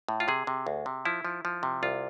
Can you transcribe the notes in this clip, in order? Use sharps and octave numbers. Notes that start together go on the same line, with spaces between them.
A2
F4
C3 G#4
C3
D2
C3
F3 E4
F3
F3
C3
C2 F4